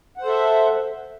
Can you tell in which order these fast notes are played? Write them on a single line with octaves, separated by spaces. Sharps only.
F#5 C5 A4 E5